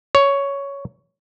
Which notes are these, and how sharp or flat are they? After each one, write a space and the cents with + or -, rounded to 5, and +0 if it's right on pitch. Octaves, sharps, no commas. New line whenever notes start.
C#5 +10